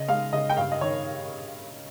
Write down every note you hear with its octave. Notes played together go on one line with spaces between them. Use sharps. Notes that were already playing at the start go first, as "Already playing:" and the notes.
Already playing: C#3 D#5
G#3 F5
C#3 D#5
G5
G2 F5
D#5
D#3 C#5